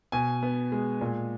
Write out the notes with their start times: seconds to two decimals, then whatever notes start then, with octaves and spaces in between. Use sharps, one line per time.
0.12 B2 G#5
0.43 B3
0.72 G#3
1.01 A#2